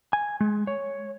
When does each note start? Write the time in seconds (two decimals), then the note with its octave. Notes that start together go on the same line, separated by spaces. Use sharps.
0.13 G#5
0.41 G#3
0.67 C#5